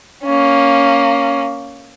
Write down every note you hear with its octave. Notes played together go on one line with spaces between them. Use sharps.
A#3 C#4